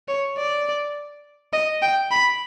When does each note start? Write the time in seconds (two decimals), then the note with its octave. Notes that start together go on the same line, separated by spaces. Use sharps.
0.08 C#5
0.37 D5
1.53 D#5
1.82 G5
2.11 B5